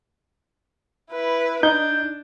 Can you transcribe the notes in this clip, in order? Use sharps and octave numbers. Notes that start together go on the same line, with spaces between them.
E4 B4
D4 D#4 G6